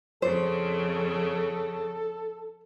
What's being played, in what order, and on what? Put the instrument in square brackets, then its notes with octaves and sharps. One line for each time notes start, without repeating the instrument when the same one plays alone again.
[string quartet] F2 C#3 [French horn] A4 [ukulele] C5